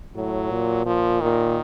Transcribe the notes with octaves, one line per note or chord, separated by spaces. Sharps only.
A2 F#3
A#2
A#2 F3
A#2 D#3